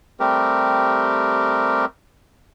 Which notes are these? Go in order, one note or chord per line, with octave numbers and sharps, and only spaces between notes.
G3 A3 C4 G4 A#4